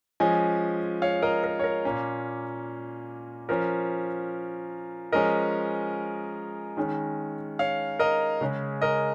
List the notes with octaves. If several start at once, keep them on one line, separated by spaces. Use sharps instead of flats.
F3 G#3 C#4 D#5 G#5
C#5 F5
A#4 D#5
A#4
C#5
A#4
A#2 A#3 C#4
F3 C#4 A#4
F3 G#3 C#4 A#4 D#5
D#3 G#3 C#4
C#5 F5
A#4 D#5
C#3 G#3 C#4
A#4 D#5